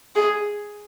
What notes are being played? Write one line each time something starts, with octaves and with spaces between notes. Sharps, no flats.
G#4